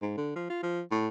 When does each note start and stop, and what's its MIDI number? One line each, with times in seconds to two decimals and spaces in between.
0.02 0.13 44
0.18 0.31 50
0.36 0.48 53
0.50 0.62 65
0.63 0.81 53
0.91 1.08 45